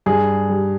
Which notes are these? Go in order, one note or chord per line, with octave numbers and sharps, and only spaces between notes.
G2 G#4
G3